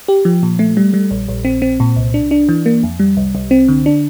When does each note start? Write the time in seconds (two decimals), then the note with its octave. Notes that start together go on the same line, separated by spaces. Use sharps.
0.08 G4
0.25 F3
0.43 A#2
0.59 A3
0.77 G3
0.94 G3
1.11 A#1
1.29 A#1
1.45 C4
1.62 C4
1.80 A#2
1.96 C2
2.14 D4
2.31 D4
2.49 E3
2.66 A#3
2.83 F2
3.00 G3
3.17 C2
3.35 C2
3.51 C4
3.68 D3
3.86 D4